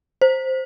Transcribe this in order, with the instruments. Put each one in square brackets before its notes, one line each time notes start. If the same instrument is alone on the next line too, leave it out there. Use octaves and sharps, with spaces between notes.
[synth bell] C5